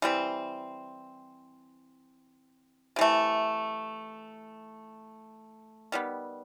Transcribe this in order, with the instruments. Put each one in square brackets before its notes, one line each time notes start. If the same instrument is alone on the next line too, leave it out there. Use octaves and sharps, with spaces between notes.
[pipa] E3 G3 C4
C3 E3 A3
D#3 G3 B3